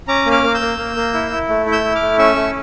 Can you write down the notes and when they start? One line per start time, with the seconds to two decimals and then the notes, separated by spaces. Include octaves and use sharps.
0.08 C#4 A#5 D6
0.26 A#3
0.31 D6 F6
0.44 A#3
0.54 E6 G6
0.60 A#3
0.78 A#3
0.96 A#3
1.14 E4
1.31 E4
1.49 A3
1.66 E4
1.72 E6 G6
1.84 E4
1.95 D6 F6
2.01 A3
2.18 C#4 C#6 E6
2.36 A3